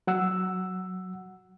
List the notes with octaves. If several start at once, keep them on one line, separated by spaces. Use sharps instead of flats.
F#3 F#5 E6